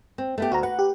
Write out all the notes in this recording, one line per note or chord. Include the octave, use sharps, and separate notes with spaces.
C4
A3 B3 G4
D2 F#4 A#5
B4 F#5
G4